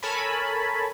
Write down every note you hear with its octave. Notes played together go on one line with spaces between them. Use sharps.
A4 A#4 C#5 G#5 A5 B5